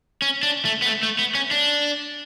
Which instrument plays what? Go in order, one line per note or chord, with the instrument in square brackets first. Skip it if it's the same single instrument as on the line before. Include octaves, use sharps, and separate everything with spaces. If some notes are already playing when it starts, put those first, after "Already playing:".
[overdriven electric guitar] C#4
D4
A3
B3
A3
A3
B3
C#4
D4